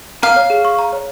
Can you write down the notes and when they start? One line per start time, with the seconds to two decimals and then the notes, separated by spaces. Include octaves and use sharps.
0.23 F5 A#5
0.36 C#5
0.50 G#4
0.65 C#6
0.79 A#5
0.93 C#5